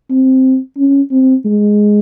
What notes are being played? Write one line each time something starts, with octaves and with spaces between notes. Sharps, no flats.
C4
C#4
C4
G#3